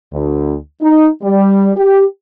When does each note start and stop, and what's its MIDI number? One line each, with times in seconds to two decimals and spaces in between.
0.13 0.55 38
0.82 1.07 63
1.23 1.70 55
1.76 2.03 67